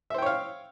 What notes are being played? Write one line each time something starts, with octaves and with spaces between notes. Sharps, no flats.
C5 C#5 E5 F5 G5